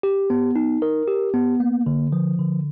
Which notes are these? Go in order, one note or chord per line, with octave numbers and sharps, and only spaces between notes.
G4
B3
D#4
A#4
G4
B3
A#3
D3
F3
D3